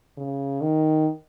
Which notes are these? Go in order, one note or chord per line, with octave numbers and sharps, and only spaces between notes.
C#3
D#3